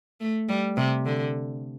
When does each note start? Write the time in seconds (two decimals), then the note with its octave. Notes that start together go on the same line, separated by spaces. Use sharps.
0.20 A3
0.49 G3
0.77 C3
1.06 D3